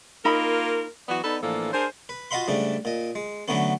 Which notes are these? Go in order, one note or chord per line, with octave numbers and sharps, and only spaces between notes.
A#3 D#4 F4 A#4 B5
E3 F#3 B3 F#4 D5
B3 D#4 A4 B4 D5
A2 E3 F3 A#3 D4 A4
D4 G#4 A#4 C5
B4
F4 F#4 D#5 F5 B5 C6
G#2 C#3 G3 A3 D4
A#2 D#5
G#3
D3 E3 F#3 A3 B3 C#4